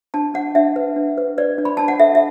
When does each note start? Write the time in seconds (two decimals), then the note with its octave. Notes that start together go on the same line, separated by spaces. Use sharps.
0.14 D4 A5
0.34 D4 F#5
0.55 D4 E5
0.76 B4
0.96 D4
1.18 B4
1.38 B4 D5
1.58 D4
1.65 B5
1.77 D4 A5
1.88 F#5
2.00 A4 E5
2.15 E5